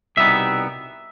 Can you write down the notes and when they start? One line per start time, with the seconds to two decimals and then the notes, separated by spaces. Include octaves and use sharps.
0.17 C2 B2 G3 B3 D#4 E5